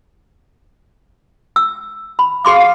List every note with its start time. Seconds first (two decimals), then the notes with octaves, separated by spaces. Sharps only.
1.56 E6
2.19 B5
2.45 G#4 F5 C6 D6